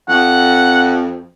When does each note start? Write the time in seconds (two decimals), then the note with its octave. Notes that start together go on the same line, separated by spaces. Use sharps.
0.09 F2 F#5